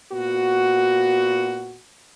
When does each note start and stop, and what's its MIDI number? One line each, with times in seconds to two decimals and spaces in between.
0.13 1.78 46
0.13 1.78 59
0.13 1.78 66